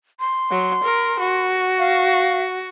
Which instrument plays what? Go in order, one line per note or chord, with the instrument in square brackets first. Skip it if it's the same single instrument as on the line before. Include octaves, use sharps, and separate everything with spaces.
[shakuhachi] C6
[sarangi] F#3
A#4
F#4
[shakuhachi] F5